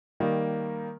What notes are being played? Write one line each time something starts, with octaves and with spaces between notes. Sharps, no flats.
D#3 G3 A#3